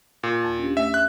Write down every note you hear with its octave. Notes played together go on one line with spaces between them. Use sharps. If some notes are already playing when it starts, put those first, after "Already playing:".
A#2
D#2 A5 A6
C#4 D4 G4
A3 E5
F#6